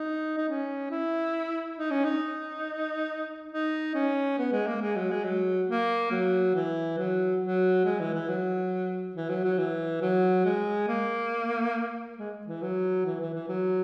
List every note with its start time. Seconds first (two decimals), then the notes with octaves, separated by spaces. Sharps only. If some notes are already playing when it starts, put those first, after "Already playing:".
Already playing: D#4
0.37 D#4
0.48 C#4
0.91 E4
1.78 D#4
1.91 C#4
2.05 D#4
3.52 D#4
3.94 C#4
4.39 B3
4.52 G#3
4.67 A#3
4.81 G#3
4.96 F#3
5.11 G#3
5.24 F#3
5.68 A#3
6.11 F#3
6.54 E3
6.98 F#3
7.42 F#3
7.85 G#3
8.00 E3
8.14 E3
8.28 F#3
9.16 E3
9.29 F#3
9.44 F#3
9.58 E3
10.02 F#3
10.45 G#3
10.88 A#3
12.18 G#3
12.47 E3
12.62 F#3
13.05 E3
13.20 E3
13.34 E3
13.48 F#3